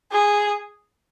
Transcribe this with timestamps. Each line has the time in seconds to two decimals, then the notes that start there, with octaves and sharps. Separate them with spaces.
0.12 G#4